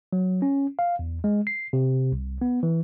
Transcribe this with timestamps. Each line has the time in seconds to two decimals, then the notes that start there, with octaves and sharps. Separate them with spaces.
0.13 F#3
0.42 C#4
0.79 F5
0.99 E2
1.24 G#3
1.47 C7
1.73 C3
2.12 C2
2.42 B3
2.63 E3